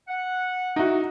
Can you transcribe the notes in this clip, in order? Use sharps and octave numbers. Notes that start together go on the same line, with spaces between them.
F#5
D#4 E4 F#4